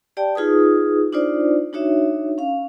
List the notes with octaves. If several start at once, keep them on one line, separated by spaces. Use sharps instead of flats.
G4 D5 G5 A5
D#4 F4 G#4 B4 D#6
D4 D#4 F4 C5 D5
D4 D#4 F#4 C#5 E5
C#4 F5